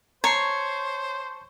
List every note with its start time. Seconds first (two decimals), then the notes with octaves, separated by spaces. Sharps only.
0.24 C5 C#5 A5 A#5 C#6 C7